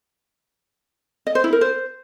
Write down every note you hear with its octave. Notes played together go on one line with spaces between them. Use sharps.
D#5
C5
E4
A#4
C5